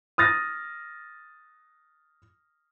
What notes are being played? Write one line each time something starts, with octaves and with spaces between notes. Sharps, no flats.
D#6 F6 A6 A#6